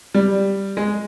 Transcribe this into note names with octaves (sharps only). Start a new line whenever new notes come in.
G3
G#3